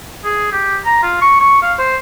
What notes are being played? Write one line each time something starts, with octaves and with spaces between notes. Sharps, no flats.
G#4
G4
A#5
F4
C#6
C#6
F5
C5